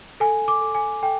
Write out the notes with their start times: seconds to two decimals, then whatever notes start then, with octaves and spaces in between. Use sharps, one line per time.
0.20 A4 G#5
0.48 D6
0.61 A4
0.75 G#5
1.03 A4 G5